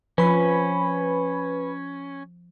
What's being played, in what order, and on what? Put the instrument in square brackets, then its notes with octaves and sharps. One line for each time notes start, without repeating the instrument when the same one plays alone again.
[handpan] F3 [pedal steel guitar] C#4 [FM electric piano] B4 B5